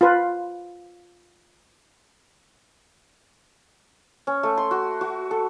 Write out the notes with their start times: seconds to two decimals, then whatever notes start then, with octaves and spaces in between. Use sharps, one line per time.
0.01 F4 B4
4.27 C#4
4.43 A3
4.58 C6
4.71 F#4
5.01 F#4
5.31 A4